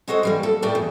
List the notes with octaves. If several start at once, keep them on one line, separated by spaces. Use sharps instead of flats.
G#3 F#4 A4 C5 D#5
E3 G3 A#3
A4
A2 A3 G4 D5 A5
E2